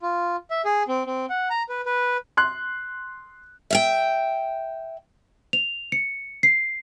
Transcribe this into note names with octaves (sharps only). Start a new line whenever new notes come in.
F4
E5
G#4
C4
C4
F#5
A#5
B4
B4
C6 F#6
E5 F5 G5
F7
C#7
C7